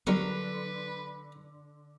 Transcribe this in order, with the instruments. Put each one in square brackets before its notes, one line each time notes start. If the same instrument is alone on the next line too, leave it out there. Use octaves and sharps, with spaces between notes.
[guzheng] D3 [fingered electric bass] F#3 B3 [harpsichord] G3 A#4 C#6 [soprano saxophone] B4